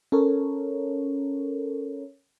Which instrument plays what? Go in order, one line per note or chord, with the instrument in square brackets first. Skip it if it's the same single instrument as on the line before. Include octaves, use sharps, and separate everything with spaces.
[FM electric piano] C#4 A4 A#4 C#5